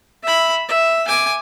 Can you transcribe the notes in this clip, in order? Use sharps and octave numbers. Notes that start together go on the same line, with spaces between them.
E5 B5
E5
G#5 D6